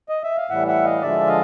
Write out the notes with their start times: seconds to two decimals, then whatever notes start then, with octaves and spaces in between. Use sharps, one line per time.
0.09 D#5
0.23 E5
0.37 F5
0.49 A2 E3 G3 E5 F#5
0.67 E5 F#5
0.85 D#5 F5
1.01 D3 F3 G#3 D5 E5
1.28 D#5 F5